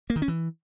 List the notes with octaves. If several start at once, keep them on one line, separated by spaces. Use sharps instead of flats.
A#3
D#3
C#4
E3